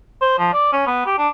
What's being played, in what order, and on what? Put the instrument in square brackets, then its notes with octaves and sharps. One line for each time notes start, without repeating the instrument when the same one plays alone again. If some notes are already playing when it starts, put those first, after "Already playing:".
[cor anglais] C5
F3
D5
C#4
B3
G4
D4